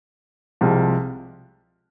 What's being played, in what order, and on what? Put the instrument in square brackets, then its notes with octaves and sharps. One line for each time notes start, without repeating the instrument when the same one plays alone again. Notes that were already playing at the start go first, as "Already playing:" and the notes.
[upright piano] C2 C3 F3 G#3